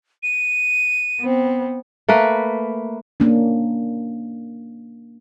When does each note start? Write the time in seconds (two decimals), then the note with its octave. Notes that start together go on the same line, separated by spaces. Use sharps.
0.23 D#7
1.20 B3 C4
2.09 A3 A#3 B4
3.20 A#3 C#4 D4